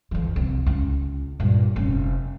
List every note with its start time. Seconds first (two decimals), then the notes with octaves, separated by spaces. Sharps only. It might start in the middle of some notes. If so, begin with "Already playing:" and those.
0.11 F2 E3
0.36 C2
0.66 C#2
1.40 G2 A#2
1.76 F1 C#4